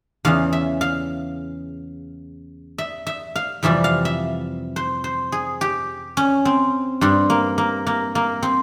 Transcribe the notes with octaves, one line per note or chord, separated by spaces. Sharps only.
E2 C#3 E3 F5
E5
F5
E5
E5
F5
F2 C3 E3 G3 E5
F5
E5
C5
C5
G#4
G4
C#4
C4
G2 G3 C4
A#3
A#3
A#3
A#3
C4